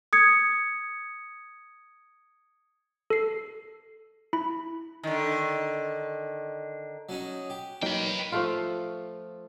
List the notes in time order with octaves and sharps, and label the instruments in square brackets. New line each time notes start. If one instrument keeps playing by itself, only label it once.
[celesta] D#6 G#6 C#7
[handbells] A4 C7
E4 B5
[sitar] D3 D#3
[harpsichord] F#3 C#4 D#4
G4
[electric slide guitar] F#3 A#3 D#4 [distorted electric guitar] B4 G5
[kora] F3 A3 F4